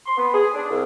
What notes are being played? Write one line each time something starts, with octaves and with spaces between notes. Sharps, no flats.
C6
B3
G#4
D4
C2